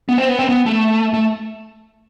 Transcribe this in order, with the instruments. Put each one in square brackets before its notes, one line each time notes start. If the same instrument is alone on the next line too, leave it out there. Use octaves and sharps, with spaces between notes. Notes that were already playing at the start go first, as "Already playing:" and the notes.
[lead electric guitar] B3
C4
B3
C4
B3
A3
A3